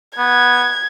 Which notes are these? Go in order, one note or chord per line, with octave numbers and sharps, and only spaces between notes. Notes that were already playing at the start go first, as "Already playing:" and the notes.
B3 G#6